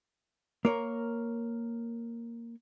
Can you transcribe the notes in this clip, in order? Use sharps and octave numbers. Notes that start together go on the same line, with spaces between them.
A#3 A#4 C#5